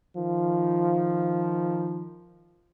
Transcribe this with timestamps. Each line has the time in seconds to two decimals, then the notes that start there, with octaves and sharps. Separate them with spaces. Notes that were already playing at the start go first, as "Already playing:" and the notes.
0.15 D#3 F3